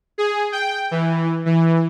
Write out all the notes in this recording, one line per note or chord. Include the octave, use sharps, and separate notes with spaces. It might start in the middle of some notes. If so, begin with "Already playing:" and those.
G#4
G5
E3
E3